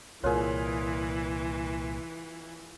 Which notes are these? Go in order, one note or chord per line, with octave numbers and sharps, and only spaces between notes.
C2 A#2 E3 F4 G#4 A#4 C#5